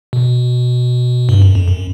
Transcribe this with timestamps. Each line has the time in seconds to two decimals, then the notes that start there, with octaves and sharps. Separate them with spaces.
0.13 B2
1.29 G2
1.42 F#2
1.55 F2
1.68 F#2